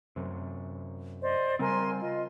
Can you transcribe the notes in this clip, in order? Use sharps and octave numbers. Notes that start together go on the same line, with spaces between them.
F#2 C3
C5 D5 D#5
C#3 G3 C4 A#4 G#5 C6
F4 D#5